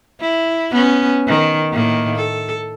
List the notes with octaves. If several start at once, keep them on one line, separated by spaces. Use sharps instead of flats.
E4
B3 C#4
D#3
A2 D#3 A#3
A4